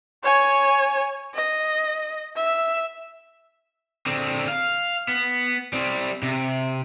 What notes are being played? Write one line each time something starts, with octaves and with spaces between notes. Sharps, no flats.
C#5 G#5
D#5
E5
D3 C4
F5
B3
G3 C4
C3